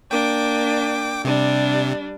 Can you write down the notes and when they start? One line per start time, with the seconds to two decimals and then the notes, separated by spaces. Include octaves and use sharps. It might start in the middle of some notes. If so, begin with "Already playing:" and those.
0.11 A#3 D4 G5 D6
1.25 C3 G3 D4